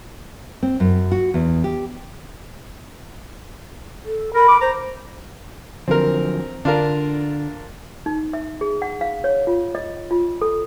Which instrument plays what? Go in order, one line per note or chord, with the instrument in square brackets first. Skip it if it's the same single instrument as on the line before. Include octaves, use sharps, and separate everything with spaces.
[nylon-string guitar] C4
F#2
F#4
E2
G4
[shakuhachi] A4
[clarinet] A#4 [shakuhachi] B5
[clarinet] D6
[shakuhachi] C5 [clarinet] A#5
[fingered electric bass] D3 F3 F#3 [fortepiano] C4 A#4
[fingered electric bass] D3 [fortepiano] D4 F4 A#4
[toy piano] D#4
E5
G#4
F#5
F5
C#5
F4
D#5
F4
A4